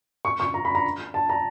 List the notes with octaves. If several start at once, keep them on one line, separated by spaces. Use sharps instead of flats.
C#6
C#6
A#5
B5
A#5
A5
A#5